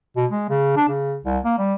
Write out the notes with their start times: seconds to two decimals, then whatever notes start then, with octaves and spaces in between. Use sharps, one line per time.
0.16 B2
0.31 G#3
0.49 C#3
0.76 D4
0.89 C#3
1.22 C2
1.45 A#3
1.58 G3